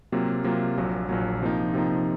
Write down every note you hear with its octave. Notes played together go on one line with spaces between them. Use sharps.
C3 F#3 A#3 F4
C3 F#3 A#3 F4
A#1 A#2 F#3
A#1 A#2 F#3
C3 F3 A#3 D#4
C3 F3 A#3 D#4